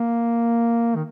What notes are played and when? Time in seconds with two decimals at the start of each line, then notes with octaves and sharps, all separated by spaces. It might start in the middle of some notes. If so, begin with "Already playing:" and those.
Already playing: A#3
0.96 D#3